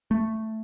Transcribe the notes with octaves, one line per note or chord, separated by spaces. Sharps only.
A3